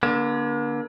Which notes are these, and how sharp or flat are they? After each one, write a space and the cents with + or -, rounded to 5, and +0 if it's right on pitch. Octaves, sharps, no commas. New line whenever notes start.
D3 +0 A#3 +45